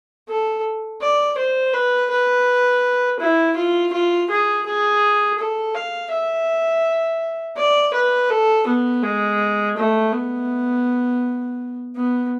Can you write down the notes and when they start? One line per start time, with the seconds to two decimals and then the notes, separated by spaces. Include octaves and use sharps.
0.29 A4
1.01 D5
1.38 C5
1.74 B4
2.11 B4
3.20 E4
3.57 F4
3.93 F4
4.30 G#4
4.67 G#4
5.39 A4
5.75 F5
6.12 E5
7.57 D5
7.94 B4
8.30 A4
8.67 B3
9.03 G#3
9.77 A3
10.12 B3
11.96 B3